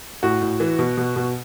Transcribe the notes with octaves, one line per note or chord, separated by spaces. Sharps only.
A2 F#4
A2
E3
B2
B2
B2